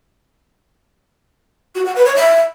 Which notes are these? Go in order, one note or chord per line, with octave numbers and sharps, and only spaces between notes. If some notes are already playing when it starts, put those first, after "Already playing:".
F#4
F#5
B4
C#5
E5